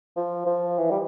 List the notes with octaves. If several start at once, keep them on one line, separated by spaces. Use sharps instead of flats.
F3
F3
E3
G3